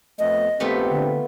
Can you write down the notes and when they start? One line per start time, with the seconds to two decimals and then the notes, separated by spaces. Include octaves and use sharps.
0.19 F2 A3 B3 D#5
0.60 A#1 A3 B3 C4 F4 G4
0.90 D3